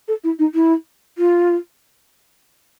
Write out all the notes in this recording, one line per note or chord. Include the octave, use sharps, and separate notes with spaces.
A4
E4
D#4
E4
F4